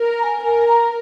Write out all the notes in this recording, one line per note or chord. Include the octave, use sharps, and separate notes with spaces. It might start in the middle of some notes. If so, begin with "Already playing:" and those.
Already playing: A#4
A#5
G#5
A#4 G#5
A#5